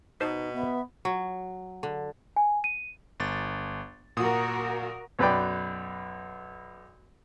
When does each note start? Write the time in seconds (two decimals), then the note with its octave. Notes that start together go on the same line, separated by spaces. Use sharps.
0.20 B2 D#4 B4 C5 A5
0.55 B3 E5
1.05 F#3
1.83 D3
2.36 G#5
2.64 D#7
3.20 G1 A6
4.17 A#2 F#4 A#4 D#6
5.19 B1 F#2 B4 D5 G5